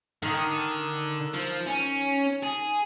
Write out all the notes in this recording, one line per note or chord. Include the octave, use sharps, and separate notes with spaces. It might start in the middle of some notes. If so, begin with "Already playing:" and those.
D3 D#3
F3
C#4
G#4